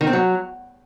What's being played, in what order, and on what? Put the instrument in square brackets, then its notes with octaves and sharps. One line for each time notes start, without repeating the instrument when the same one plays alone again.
[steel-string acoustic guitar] D#3
C4
F#3